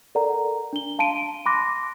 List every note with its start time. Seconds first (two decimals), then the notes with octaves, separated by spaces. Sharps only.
0.15 A4 A#4 D5 F#5 A#5
0.73 D4 G7
0.99 F5 A5 C6 D7 D#7
1.46 B5 C6 D6 F#6 A#6